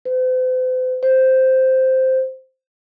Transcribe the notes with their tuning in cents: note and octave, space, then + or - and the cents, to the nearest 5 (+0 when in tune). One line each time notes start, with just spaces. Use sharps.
C5 -45
C5 +0